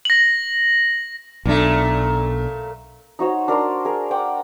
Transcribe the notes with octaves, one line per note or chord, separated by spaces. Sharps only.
A#6 F#7
B1 A#2 A3 D4
D#4 F#4 C5 C#5
D4 A#4 A#5 C6
G#4 A#4
F#5 G5 D6